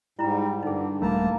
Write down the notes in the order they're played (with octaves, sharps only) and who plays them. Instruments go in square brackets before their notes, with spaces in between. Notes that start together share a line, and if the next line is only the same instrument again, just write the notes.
[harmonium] G#2 [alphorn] G3 [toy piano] E4 A#5
[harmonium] G2 [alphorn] D3 [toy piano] D#4 G#4
[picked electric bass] D#1 G3 A3 [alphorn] A#3 [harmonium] A5 A#5